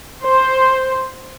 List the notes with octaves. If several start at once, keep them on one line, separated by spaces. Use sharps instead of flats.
C5